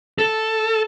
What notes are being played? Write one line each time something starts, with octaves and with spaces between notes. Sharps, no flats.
A4